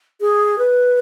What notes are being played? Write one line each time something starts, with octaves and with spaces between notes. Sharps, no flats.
G#4
B4